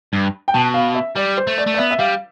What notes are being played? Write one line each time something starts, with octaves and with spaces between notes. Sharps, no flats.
G2
G5
B2 A5
F5
E5
G3 D5
C5
A3
D5
A3
D5
B3 E5
E5
G3 F5